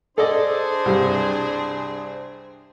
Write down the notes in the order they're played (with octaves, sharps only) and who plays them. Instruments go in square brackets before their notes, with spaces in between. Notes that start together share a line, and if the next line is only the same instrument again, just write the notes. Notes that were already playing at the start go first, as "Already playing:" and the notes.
[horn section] D4 G#4 C5 [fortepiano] A4 D5 D#5
[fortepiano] C2 G2 G3